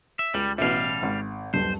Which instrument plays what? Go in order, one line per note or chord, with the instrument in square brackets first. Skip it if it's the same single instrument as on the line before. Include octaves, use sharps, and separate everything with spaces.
[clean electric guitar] E5
[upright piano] C#2 F#7 [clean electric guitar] G3
[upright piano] A1 B2 E4 [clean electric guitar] G3 F5
[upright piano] G#1
[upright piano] D#1 B1 G2 [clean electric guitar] C5